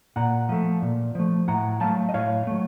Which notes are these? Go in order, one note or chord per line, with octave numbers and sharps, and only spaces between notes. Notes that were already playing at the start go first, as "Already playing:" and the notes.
A#2 F#5 A#5
F3 A3
A#2
F3 A3
A2 F#5 A#5
F#3 A3 F5 A5
D#5
A2 C#5 F5
F#3 A3